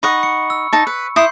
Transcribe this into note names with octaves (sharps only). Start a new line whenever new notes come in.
D#4 D#5 F#5 B5 C#6
C#7
E6
D#4 A5
B4
E4 C6 D#6 G6 C7